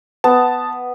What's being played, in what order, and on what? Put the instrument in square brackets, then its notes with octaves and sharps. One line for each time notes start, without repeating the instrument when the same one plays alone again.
[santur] B3 [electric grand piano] A5